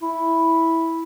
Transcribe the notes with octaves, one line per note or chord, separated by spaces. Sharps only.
E4